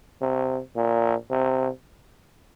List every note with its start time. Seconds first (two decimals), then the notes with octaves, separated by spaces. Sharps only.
0.21 C3
0.76 A#2
1.31 C3